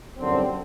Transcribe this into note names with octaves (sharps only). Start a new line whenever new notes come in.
G1 F#2 D3 G3 C4